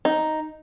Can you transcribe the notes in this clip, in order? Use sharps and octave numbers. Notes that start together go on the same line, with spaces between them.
D#4